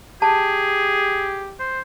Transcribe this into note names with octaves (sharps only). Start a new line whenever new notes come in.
G4 G#4 A5
C5